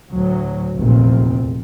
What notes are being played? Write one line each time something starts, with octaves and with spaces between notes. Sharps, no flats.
D2 A2 F#3
F1 A#1 E2 A#2 C4